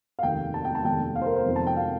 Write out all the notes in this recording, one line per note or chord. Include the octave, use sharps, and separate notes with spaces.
F5
F1 D#2 D#3 G5
A5
G5
A5
F1 D#2 D#3 G5
F5
C5
A#4
C5
F1 F2 D#3
A5
G5
F5